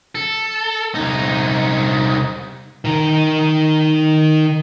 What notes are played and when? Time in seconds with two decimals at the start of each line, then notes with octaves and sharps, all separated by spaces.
0.15 A4
0.95 C2 D#4
2.85 D#3 A#5